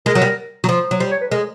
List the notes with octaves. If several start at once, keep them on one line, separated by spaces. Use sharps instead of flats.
G#3 A#4
F#3
G3
F#3
F3
F#3
G3 C5
C#5
B4
G#3 A#4